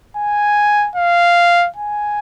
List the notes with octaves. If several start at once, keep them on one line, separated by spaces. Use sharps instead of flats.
G#5
F5
G#5